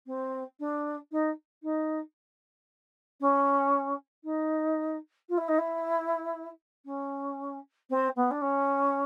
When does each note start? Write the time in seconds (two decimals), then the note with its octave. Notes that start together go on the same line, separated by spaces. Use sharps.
0.07 C4
0.60 D4
1.11 D#4
1.63 D#4
3.20 C#4
4.24 D#4
5.29 F4
5.38 E4
5.48 D#4
5.58 E4
6.85 C#4
7.90 C4
8.16 B3
8.31 D4
8.41 C#4